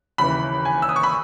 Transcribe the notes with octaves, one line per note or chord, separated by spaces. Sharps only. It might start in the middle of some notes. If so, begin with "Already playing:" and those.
D#2 C#3 E3 B5
G#5
E6
D#6
C#6
B5